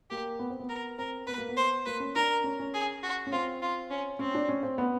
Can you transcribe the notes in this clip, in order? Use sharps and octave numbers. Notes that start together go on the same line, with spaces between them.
A#3 G4
B3
C4
B3
A#4
C4 A#4
B3 B4
A#3
B3
C5
A#3 B4
C#4
D4 A#4
C#4
C#4
G#4
F#4
C#4
C4 F4
F4
C#4
C4 C#4
D4
C#4
C4
B3